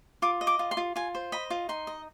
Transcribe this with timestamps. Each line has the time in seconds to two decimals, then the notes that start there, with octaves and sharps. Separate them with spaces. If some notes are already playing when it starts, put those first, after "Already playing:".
0.22 F4 D6
0.41 D#5
0.47 D6
0.59 F4
0.71 C6
0.77 F4
0.96 F4 G#5
1.15 C5
1.32 D#5 B5
1.50 F4
1.69 D#4 C6
1.87 D#5